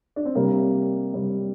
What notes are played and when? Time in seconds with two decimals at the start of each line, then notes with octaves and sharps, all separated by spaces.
0.16 D4
0.25 C4
0.35 C3 G3 A#3
1.14 C3 G3